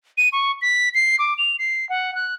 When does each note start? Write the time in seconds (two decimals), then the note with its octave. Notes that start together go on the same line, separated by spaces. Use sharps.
0.18 D#7
0.33 C#6
0.62 B6
0.94 C7
1.19 D6
1.38 F7
1.59 C7
1.89 F#5
2.15 F#6